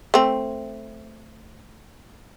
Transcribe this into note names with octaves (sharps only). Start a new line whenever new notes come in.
A3 C4